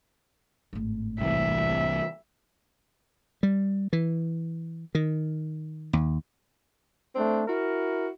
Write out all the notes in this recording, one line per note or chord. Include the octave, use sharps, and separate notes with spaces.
G#1 A2
C2 E3 E5
G3
E3
D#3
D#2
A3 C4 D4
E4 F#4 A#4